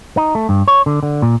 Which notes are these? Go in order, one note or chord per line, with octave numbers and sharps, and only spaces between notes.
D#4
A3
G2
C#5
D3
D3
A#2